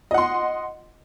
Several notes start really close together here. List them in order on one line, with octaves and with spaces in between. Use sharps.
D#5 F#5 C6